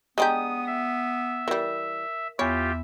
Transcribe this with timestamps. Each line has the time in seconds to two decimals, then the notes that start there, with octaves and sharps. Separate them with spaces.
0.18 G#3 B3 D4 G4 G5 G#5 A#5 D#6
0.67 E5
1.48 E3 G3 A#4
2.39 E2 B3 F4 G4 C#5 E5